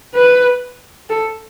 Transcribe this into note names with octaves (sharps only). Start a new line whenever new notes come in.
B4
A4